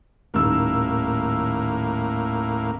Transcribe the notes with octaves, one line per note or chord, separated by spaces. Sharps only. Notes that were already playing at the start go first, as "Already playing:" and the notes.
D#1 A2 D#3 A#3 E6